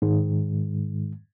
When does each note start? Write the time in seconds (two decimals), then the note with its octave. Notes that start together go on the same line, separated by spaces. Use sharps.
0.02 G#2 D#3 G#3